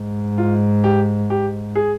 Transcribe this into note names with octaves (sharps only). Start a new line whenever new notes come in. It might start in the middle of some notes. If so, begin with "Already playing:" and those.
Already playing: G#2
F4
G4
G4
G#4